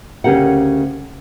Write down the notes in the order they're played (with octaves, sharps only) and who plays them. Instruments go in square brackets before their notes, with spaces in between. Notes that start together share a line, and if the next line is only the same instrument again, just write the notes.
[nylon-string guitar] D2 C#3 C#4 G4 A#4 F#5